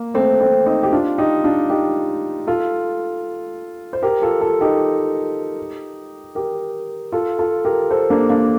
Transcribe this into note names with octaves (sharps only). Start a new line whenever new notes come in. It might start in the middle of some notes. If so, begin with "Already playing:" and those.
Already playing: A#3
A3 C4
A3 C4
C4 D#4
G4
D4 F4
D#4 G4
D4 F4
D#4 G4
F4 A4
C5
G4 A#4
F4 A4
F4 A4
D#4 G4
G4 A#4
F4 A4
F4 A4
G4 A#4
A4 C5
A#3 D4
A#3 D4